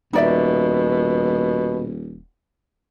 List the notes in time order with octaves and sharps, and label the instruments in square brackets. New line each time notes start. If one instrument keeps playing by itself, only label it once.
[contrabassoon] D#1 [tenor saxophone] B2 [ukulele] D#4 D5 E5